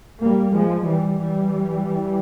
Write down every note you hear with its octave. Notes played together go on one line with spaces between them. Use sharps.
G3 A#3
F3 G#3
E3 G3
E3 G3